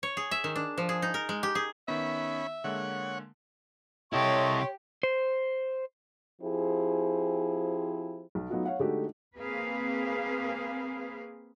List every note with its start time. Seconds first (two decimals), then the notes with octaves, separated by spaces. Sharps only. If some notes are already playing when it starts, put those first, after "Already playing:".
0.03 C#5
0.17 G#4
0.31 E5
0.44 D#3
0.56 D4
0.78 F3
0.89 G#4
1.02 D#4
1.14 A#4
1.29 G#3
1.43 G4
1.55 G#4
1.88 D#3 B3 C#4 E5 B5
2.64 D3 G#3 A#3 C#5 F#5
4.13 C3 E4 G4 A4 C#5 D#5 C6 C#6
5.03 C5
6.42 F3 C4 E4 G4 G#4
8.35 B1
8.50 F#3 A3 B3 D#4 F4 F#4
8.65 C#5 F5 F#5
8.79 D3 G#3 A3 D#4 F#4 G4
9.37 A#3 C4 G#4 B4 F5